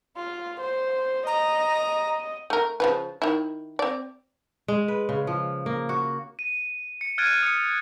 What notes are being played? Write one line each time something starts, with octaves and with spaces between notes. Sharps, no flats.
F4
C5
D#5 A#5
A3 A#4
C#3 F3 B4
D#3 E4
C4 D5
G#3
B4
C#3
F3
A#3
F#4
D#7
C#7
F6 F#6 G#6 A6 D7 D#7
D#6 C#7